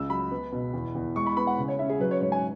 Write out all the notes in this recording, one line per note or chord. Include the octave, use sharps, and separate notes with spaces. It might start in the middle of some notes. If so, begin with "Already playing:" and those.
Already playing: C#2 E6
F#3 B5
B3
B2
E2
E2
G#3 C#6
B5
B3 B5
F#5
C#3
C#5
C#4 E5
G#4
F#3 B4
C#5
G#2 C#5
G#5